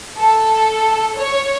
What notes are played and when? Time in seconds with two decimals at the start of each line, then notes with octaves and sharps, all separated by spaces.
0.18 A4
1.17 C#5